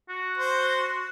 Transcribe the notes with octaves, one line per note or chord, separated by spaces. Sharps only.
F#4
C5